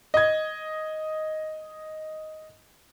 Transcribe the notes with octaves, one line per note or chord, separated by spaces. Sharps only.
D#5 G#6